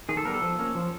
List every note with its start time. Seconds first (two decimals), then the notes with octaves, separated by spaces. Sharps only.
0.09 D#3 G#4
0.17 A4
0.25 G3 B3 A#4
0.34 A4
0.42 F3
0.58 A#3 C#4
0.75 F3